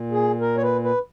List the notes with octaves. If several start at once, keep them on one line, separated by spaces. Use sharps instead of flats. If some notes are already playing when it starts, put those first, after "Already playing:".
Already playing: A#2
G#4
A#4
C#5
B4
B4